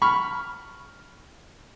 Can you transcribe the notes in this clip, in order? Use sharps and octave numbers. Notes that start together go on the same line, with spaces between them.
B5 C#6 F6